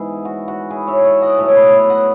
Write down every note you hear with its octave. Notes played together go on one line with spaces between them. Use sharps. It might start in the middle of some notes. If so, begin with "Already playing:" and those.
Already playing: G#2 E3 B3 E4 G#4
F#4
F#4
E4 G#4
C#5 E5
C#5 E5
D#5 F#5
A2 F#3 B3 C#5 E5
E5
B4 D#5
C#5 E5
D#5 F#5